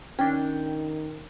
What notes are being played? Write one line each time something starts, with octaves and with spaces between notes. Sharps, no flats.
D#3 C#4 D4 G5